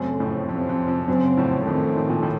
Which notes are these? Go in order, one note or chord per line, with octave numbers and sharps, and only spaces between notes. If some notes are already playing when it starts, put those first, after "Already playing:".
Already playing: F#2 C#3 A3 C4
F2 A2
F2 C3 F3 C4
F2
F2
F#2 C#3 F#3 C4
F2 A2
F2 A2 D#3 A3 C4
A2
A#2
A2